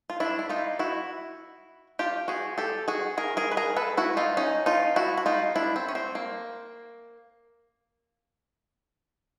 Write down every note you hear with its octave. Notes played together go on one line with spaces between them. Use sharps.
F4
D4 E4
E4
D#4 F4
E4 F#4
F4 G4
F#4 G#4
G4 A4
F#4 G#4
G#4 A#4
G#4 A#4
B4
G#4 A#4
A4 B4
E4 F#4
D#4 F4
C#4 D#4
D#4 F4
E4 F#4
F#4
D#4 F4
D4 E4
C4
C#4
C4
A#3